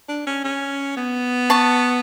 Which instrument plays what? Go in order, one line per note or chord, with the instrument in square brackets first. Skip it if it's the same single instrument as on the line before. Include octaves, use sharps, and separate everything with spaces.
[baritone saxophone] D4
C#4
C#4
B3
[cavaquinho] A5 C#6